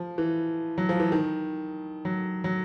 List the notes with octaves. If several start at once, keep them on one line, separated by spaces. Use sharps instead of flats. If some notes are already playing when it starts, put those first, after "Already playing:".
Already playing: F3
E3
F#3
F3
E3
D#3
F#3
F#3